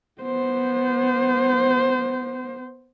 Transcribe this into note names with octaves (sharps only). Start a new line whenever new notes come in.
B3 C5